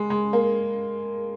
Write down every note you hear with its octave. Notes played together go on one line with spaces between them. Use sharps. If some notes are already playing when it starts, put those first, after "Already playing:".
Already playing: G#3
G#3
A#3